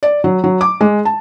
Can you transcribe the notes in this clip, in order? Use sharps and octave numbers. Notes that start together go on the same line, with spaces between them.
D5
F#3
F#3
D6
G#3
A5